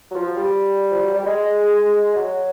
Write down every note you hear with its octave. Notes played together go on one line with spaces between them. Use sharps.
F#3
F3
G3
F3
F#3
G3
G#3
F#3